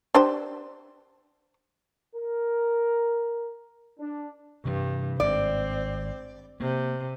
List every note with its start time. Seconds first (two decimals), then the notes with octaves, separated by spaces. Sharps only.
0.15 D4 G4 C5
2.14 A#4
3.99 D4
4.65 G2 C3 E3 G3
5.20 G#1 G#2 G#3 C4 D5
6.60 C3 A#3